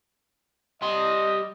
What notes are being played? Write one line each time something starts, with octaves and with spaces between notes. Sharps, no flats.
G3 D#5 C6